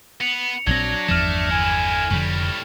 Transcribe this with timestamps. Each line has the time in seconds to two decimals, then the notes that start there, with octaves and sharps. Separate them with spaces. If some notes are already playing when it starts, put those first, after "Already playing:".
0.21 B3 C#7 F7
0.67 A#1 C#3 F#3 C4 D4 G#6 A#6
1.09 G1 E2 F3 A3 F6 E7
1.51 D3 E4 G#5
2.11 F1 F2 A2 D3 G3